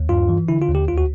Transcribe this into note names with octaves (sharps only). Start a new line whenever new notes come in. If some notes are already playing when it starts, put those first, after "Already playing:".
Already playing: D#2
G2 F4
E3
D3 E4
F4
D#2
G4
D2 F4
F#4